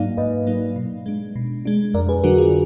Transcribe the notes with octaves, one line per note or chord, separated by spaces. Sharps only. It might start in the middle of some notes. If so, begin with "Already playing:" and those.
Already playing: G#2 F#3 A#3 D#4 D5 F5
G#2 B4 D#5
F#3 A#3 D#4
B2
G#3 D4
B2
G#3 D4
F2 A#4 D5
G#4 B4
D3 F#3 D4 F#4 A#4
F4 G#4